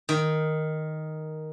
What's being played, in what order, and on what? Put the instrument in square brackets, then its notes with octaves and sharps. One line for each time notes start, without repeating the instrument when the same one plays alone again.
[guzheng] D#3